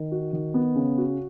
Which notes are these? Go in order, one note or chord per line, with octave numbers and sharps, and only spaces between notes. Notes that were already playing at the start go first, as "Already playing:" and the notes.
Already playing: D#3
F#4
D#3
B3
C#3
F#4